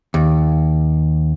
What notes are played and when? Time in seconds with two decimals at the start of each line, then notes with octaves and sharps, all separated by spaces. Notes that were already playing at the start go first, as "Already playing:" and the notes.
0.14 D#2